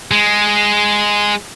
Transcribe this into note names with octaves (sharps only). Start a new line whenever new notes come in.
G#3